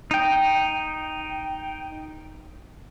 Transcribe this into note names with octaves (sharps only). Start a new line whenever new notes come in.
D#4 G5